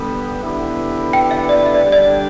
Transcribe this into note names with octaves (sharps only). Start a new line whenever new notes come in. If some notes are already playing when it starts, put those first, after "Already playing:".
Already playing: D3 G3 B3 G4 B4
D3 B3 E4 G4 B4
G5
E5
D5
E5
D5
D3 G3 D4 G4
D5